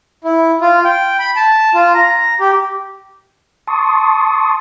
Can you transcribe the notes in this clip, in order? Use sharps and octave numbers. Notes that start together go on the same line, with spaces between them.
E4
F4
G5
B5
A5
F4
A#5
G4
A5 C6 C#6 D#6